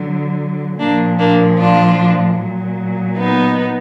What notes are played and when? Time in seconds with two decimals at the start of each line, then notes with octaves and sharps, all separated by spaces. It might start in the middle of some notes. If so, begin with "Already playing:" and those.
Already playing: D3 F#3
0.79 A#2 F3 A#3 D4
1.18 A#3 D4
1.58 D4 F4
2.38 A#2 F#3
3.17 B3 D#4